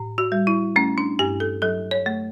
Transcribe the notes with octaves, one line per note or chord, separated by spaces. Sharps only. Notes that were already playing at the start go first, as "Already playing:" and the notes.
Already playing: A2
F#4
G3
E4
A3 C#4
D4
G2 G4
A4
F#3 A4
C#5
A3